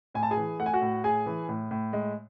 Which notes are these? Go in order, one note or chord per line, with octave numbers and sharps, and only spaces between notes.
A2 G#5
A5
G#4 G#5
E3
A3 F#5
G#5
F#4 F#5
A2
A2 G#4 G#5
E3
A2
A2
G#3